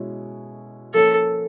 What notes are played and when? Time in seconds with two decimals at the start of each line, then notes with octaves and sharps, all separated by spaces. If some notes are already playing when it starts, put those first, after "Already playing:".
Already playing: B2 G#3 C#4 E4
0.94 F3 A#3 C#4 A4